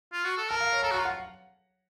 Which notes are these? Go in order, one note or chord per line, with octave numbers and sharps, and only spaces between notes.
F4
F#4
A4
A#4 A5
F5
C#5
A4 A#5
F#4
A#5
F4
F#5